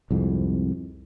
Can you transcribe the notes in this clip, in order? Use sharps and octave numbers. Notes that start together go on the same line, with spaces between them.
C2 F2 G#2